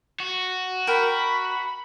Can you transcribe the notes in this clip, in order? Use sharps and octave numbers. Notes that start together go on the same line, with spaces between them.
F#4
A#4 G5 B5